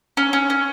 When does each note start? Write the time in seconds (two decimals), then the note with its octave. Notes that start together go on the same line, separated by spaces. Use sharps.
0.17 C#4
0.33 C#4
0.50 C#4